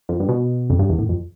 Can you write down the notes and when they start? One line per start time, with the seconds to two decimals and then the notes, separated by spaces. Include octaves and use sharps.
0.09 F2
0.20 G2
0.29 B2
0.70 F2
0.79 G2
0.89 E2
0.99 A2
1.09 F2